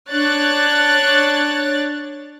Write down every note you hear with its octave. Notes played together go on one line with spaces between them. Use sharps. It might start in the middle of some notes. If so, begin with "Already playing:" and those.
D4 C#5 F#6 A6